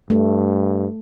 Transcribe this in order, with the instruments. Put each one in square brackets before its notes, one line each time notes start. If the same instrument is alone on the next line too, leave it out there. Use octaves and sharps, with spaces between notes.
[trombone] G2 [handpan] A3